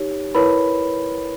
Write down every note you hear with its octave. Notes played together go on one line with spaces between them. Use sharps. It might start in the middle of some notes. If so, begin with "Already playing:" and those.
Already playing: D#4 G4 C#5
E4 A#4 B4 C#5 B5